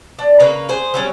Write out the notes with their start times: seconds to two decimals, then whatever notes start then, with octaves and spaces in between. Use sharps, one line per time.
0.19 D4
0.40 C#3 A#3 B4 A#5
0.69 G#4 C5
0.94 F#3 G3 C#4